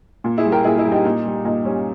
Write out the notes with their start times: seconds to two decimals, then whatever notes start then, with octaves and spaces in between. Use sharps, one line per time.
0.24 A#2
0.38 E4 G#4
0.46 G3
0.52 G4 A#4
0.64 A#2 E4 G#4
0.78 E4 G#4
0.85 G3
0.92 D#4 G4
1.05 A#2 D#4
1.26 G3
1.45 A#2 D#4
1.65 G3 C#4